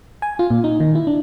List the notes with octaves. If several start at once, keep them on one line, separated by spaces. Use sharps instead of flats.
G#5
F4
A#2
D#4
D#3
E4
D4